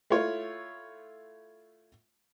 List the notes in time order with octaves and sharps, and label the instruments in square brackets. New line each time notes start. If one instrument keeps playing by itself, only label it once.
[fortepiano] A3 E4 F4 C#5